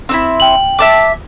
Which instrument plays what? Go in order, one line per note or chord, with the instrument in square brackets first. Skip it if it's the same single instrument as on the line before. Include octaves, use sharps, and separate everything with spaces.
[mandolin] C4 D#4 E4
[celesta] G5 F#7
[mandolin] E5 A5 D6